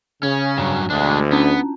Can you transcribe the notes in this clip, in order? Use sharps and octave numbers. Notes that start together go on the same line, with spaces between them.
C#3 C#4
G2 F#3 G#5
D2 G#3 D4
B3 C#4 D4